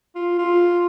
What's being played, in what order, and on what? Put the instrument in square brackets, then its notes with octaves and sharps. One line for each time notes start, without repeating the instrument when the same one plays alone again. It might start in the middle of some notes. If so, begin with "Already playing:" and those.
[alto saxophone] F4
F4